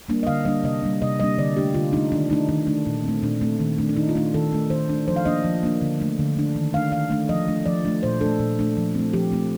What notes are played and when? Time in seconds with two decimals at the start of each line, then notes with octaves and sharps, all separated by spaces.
0.09 G3 A#3 D4
0.23 D#5
0.27 D3 F5
0.45 G3 A#3 D4 D#5
0.64 C3 D#5
0.82 G3 A#3 D4
1.02 C3 D#5
1.20 G3 A#3 D4 D#5
1.38 D3 D5
1.57 A3 D4 G4
1.74 D3 F4
1.93 A3 D4 D#4
2.12 D#3 D4
2.30 A3 D4 D#4
2.49 D#3 D4
2.67 A3 D4
2.86 A#2
3.04 A3 C4
3.22 A#2 D4
3.41 A3 C4
3.60 D#3
3.78 A3 D4
3.89 D4
3.97 D#3 D#4
4.09 F4
4.15 A3 D4
4.34 D#3 A4
4.52 A3 D4
4.70 D#3 C5
4.89 A3 D4
5.08 F3 C5
5.16 F5
5.25 A#3 D4 D#5
5.44 F3
5.63 A#3 D4
5.82 D3
6.00 A3 D4
6.19 D3
6.36 A3 D4
6.56 D#3
6.73 A3 D4 F5
6.92 D#3 F5
7.10 A3 D4
7.29 F3 D#5
7.48 A3 D4
7.66 F3 D5
7.85 A3 D4
8.03 A#2 C5
8.21 A3 D4 A4
8.40 A#2
8.59 A3 D4
8.77 F3
8.95 A3 C4
9.13 F3 G4
9.32 A3 C4